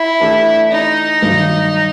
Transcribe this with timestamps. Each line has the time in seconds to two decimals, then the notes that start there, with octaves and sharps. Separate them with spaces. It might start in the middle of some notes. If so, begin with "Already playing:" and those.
Already playing: E4
0.20 E3 A3 D4 G4
0.71 D#4
1.22 G2 D#3 F#3